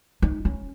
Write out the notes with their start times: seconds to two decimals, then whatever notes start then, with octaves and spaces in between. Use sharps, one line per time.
0.22 D#4
0.45 C#4